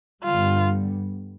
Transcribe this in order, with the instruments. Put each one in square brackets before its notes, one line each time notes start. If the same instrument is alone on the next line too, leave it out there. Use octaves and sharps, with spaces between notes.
[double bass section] G2 D3 G3 B3 [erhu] F4